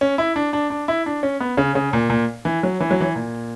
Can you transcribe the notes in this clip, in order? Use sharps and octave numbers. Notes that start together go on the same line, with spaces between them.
C#4
E4
D4
D4
D4
E4
D4
C#4
B3
C#3
C#3
A#2
A#2
E3
F#3
E3
F#3
E3
A#2